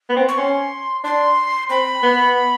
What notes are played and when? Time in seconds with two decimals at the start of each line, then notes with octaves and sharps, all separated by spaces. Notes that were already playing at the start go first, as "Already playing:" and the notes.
0.09 B3
0.16 C4
0.28 C#6
0.38 C#4 C6
1.04 D4 C6
1.70 C4 B5
2.03 B3